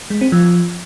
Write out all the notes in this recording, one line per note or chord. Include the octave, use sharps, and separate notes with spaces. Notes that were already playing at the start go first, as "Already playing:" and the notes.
G#3
C4
F3